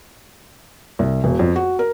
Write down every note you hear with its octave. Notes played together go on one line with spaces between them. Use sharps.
C2
E1
F2
F#4
A#4